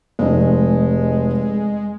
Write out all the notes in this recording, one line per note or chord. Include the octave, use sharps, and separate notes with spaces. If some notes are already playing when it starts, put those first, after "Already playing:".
F1 G#3 D#4